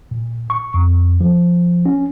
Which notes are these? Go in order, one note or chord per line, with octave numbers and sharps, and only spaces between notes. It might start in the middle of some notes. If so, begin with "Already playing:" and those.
A#2
C#6
F2
F3
C#4